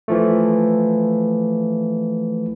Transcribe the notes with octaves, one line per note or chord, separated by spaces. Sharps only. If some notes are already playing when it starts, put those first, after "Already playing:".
E3 F3 A3